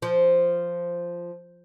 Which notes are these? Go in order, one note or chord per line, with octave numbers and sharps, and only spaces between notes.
F3